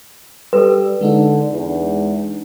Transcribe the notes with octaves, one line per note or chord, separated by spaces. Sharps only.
G3 A4 B4 E6
D3 G#3 D4 D#4
E2